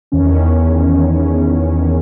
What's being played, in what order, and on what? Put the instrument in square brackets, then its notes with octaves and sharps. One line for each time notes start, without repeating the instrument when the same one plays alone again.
[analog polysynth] E2 D#3 C#4